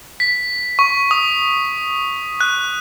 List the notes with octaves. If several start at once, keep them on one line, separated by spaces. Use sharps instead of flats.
B6
C#6
D#6
F#6